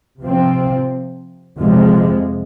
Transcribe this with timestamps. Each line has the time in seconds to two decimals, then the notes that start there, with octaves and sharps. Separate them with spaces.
0.21 C3 F3 C4
1.58 F2 C3 F3 G#3